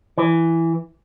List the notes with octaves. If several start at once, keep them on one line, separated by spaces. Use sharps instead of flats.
E3